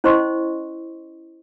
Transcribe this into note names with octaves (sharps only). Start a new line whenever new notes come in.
C#4 E4 C5 D#5 C6 C#6